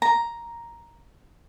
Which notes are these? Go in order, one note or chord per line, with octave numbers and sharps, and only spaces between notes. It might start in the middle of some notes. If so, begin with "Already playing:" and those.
A#5